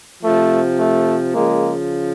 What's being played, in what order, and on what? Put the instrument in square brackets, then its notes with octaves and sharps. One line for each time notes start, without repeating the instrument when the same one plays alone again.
[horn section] C3 F3 A3
A3
C#3 F3 G#3 A#3